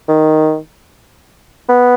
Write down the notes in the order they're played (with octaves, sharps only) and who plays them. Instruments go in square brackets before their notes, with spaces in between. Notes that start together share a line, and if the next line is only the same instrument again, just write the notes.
[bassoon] D#3
B3